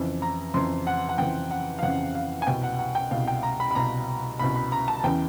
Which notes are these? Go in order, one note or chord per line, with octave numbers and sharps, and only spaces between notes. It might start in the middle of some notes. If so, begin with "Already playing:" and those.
Already playing: F2 C#3 E3
A#5
F2 C#3 E3 C6
F#5
F#5
F2 C#3 E3 G5
F#5
F5
F2 C#3 E3 F#5
F5
G#5
C2 B2 G5
F#5
F#5
G5
C2 B2 F5
G5
A#5
B5
B5
C2 B2 A#5
C2 B2 B5
B5
A#5
A5
E2 C#3 E3 G5